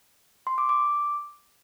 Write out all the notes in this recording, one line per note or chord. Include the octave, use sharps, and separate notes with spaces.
C6
D6
D6